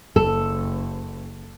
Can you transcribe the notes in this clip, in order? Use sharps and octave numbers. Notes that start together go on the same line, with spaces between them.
F#1 A4